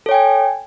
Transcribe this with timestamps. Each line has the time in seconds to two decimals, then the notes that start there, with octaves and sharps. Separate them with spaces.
0.06 A4
0.09 C#5
0.11 G5
0.14 G#5